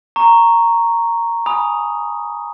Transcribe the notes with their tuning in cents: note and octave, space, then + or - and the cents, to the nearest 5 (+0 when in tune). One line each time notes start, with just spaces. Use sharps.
A#5 -5 C#6 +0
G#5 +0 B5 -25 D#6 +0